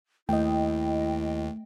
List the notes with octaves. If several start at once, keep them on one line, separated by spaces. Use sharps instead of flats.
D#2 A3 E4 D#5 G5